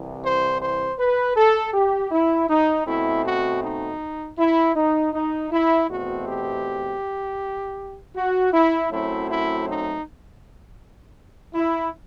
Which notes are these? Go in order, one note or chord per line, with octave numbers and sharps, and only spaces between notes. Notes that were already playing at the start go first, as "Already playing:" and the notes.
Already playing: C2 C3 E3
C5
C5
B4
A4
G4
E4
D#4
B2 A3 C4 E4
F#4
D#4
E4
D#4
D#4
E4
E2 B2 A3 C4 F#4
G4
F#4
E4
F#2 F#3 A3 C4 E4
E4
D#4
E4